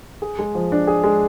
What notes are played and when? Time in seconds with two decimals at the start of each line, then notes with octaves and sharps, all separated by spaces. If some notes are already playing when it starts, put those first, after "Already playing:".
0.22 G#4
0.39 G#3
0.55 F3
0.72 D4
0.87 G#4
1.04 G#3